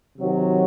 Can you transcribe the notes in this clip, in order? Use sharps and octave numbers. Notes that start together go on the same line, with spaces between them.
C3 D#3 F#3